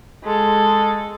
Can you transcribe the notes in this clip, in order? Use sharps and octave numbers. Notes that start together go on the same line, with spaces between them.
G#3 A4